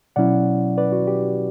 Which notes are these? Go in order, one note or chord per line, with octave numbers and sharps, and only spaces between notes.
B2 F#3 C#4 E4 D5 F#5
B4 D5
F#4
G4